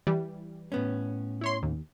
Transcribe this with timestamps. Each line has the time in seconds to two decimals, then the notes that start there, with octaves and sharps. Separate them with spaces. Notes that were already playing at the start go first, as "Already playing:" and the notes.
0.07 E3 G3
0.72 A2 B3 C#4
1.41 E4 C#5 C6
1.63 D#2